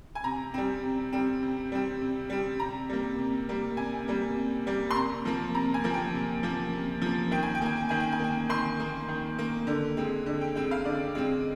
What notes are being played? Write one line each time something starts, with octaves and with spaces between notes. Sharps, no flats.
G#5
C3 A#5
G3 C4
C3
G3 C4
C3
G3 C4
C3
G3 C4
C3 A#5
G3 A#3
C3
G3 A#3
C3 G#5
G3 A#3
C3
G3 A#3
C6
C3 A#5
F3 A#3
C3 A#5
G#5
F3 A#3
G5
C3
F3 A#3
C3
F3 A#3
D#3 G5
G#5
G5
A#3 G#5
G5
D#3 G#5
G5
G#5
A#3 G5
D#3 C6
A#3
D#3
A#3
D3
G#3 C4
D3
G5
G#3 C4 G5
F5
D3 D5
G#3 C4